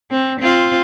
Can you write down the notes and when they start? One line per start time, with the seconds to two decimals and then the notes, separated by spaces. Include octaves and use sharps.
0.11 C4
0.40 C4 F4